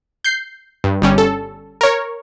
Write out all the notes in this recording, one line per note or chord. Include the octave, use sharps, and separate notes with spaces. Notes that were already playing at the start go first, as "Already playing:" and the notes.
G6 C7
G2
G1 G3 C#4
A4
A#4 C#5